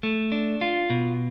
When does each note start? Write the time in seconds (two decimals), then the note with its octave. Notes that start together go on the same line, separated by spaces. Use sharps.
0.03 A3
0.32 D4
0.61 F4
0.90 B2